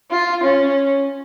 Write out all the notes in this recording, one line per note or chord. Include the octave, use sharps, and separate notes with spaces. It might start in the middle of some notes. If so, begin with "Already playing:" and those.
F4
C#4